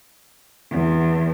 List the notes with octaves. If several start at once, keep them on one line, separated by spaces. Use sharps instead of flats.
E2